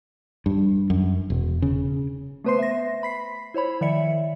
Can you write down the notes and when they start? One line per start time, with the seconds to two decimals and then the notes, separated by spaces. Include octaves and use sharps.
0.46 G2
0.90 F#2
1.30 E1
1.62 C#3
2.44 A3 B3 B4 C5 C6 C7
2.59 E5 A#6
3.03 B5 B6 C7
3.54 E4 C5 C#5 B5
3.81 D#3 F3 D5 E5 C#7